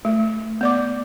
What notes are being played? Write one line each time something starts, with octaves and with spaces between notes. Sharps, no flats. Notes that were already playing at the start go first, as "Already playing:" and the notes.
A3
B3 D5 D6